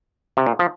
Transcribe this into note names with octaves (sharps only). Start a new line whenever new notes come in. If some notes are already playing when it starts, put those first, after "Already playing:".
C3
A#2
F3